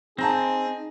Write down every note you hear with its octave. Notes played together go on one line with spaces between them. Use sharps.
C4 D#4 G#4 A5 A#5 A#6